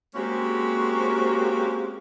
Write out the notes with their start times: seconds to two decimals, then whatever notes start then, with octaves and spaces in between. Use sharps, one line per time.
0.15 G#3 A#3 C4 C#4 F#4 G4